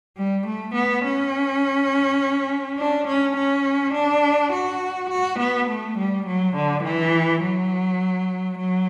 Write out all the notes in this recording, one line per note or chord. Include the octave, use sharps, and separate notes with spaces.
G3
A3
B3
C#4
D4
C#4
C#4
D4
F#4
F#4
B3
A3
G3
F#3
D3
E3
F#3
F#3